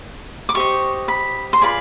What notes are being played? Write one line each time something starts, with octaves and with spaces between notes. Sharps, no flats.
D6
G4 C5 D#5 C#6
B5
C6
F4 G#4 B4 D5 B5